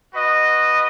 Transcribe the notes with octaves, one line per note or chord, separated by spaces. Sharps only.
F#4 B4 D#5